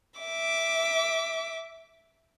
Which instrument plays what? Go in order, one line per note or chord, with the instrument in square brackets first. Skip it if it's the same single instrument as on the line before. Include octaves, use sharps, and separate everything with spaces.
[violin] E5 D6